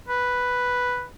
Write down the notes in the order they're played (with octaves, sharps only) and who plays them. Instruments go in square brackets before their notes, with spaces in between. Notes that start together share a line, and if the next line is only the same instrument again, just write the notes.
[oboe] B4